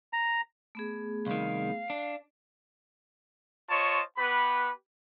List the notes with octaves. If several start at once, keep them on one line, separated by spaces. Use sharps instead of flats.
A#5
A3 B3 G#4
C2 D#3 F5
D4
F4 C5 C#5 D#5 A5 C#6
B3 G4 B4 B5